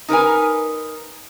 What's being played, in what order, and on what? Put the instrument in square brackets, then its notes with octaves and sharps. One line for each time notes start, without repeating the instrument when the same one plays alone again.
[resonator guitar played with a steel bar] D#4 A#4 B4 G#5